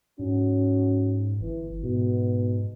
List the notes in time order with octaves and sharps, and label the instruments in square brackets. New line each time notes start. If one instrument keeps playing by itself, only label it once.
[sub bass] G#2 [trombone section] C#4 F#4
[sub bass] G1 [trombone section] E3
[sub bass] G#2 [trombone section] B2